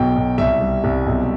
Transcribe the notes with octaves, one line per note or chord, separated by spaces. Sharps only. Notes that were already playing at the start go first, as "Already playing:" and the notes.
Already playing: B1 B2 G5
B1
C2 E5
G3
C2
B1